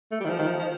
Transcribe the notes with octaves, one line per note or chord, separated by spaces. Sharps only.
A3
G3
D#3
F3
D#3
F3
F3